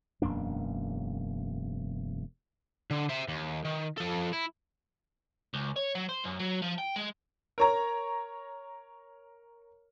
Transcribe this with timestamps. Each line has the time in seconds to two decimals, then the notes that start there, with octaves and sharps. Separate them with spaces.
0.22 E1 F#2 A#3 D4
2.91 D3
3.09 C5 E5
3.28 D#2
3.65 D#3
3.98 F3 A4
4.33 E4
5.54 C#2
5.76 C#5
5.95 F#3
6.09 C5
6.24 F#2
6.40 F#3
6.62 F3
6.78 G5
6.96 G#3
7.58 A#4 C#5 A#5